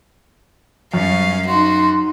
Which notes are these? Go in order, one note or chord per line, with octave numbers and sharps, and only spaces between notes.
F#2 G3 C#4 F5
D#4 F#4 C6